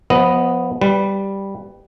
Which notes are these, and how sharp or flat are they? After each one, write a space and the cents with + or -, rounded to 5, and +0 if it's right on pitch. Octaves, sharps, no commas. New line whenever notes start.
F3 +25 B3 +0 D#5 +0
G3 +0 B4 +20